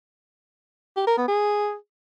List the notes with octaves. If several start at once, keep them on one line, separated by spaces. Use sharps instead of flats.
G4
A#4
B3
G#4